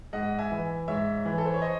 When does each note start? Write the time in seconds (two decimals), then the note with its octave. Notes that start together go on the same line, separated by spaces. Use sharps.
0.13 G#2 D#5 F#5
0.39 E5 G#5
0.51 E3
0.88 G#2 C#5 E5
1.25 E3
1.38 A4
1.46 C5
1.54 C#5
1.62 C5 D#5